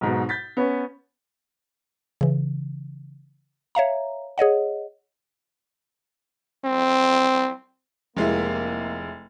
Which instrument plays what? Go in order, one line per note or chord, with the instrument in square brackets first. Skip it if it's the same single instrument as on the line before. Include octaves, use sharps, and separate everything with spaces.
[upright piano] B1 G#2 B2
G6 A6 B6
B3 C#4
[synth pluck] C#3 E3
C#5 E5 F5 A#5
G#4 C#5 D#5 F#5
[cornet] C4
[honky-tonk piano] F1 G#3 E4 [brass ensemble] A#3